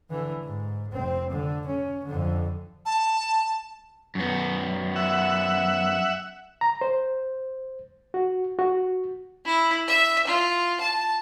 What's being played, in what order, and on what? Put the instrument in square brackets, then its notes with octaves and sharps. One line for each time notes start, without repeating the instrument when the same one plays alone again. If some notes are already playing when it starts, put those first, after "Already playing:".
[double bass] D3 E3
G#2
F1 C4
D3
C#4
F2 D3
[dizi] A5
[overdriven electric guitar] F#2 B3
[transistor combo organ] E5 F#5
[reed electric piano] A#5
C5
F#4
F#4
[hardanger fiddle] E4
E5
F4
A5